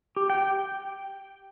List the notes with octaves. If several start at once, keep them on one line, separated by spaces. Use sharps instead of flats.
G4
G5